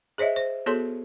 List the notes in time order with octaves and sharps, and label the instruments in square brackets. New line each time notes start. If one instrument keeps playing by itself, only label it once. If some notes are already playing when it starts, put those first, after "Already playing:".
[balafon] G#4 C5 C#5 D#5 E5
C5
B3 F#4 G#4 A4 C#5 C6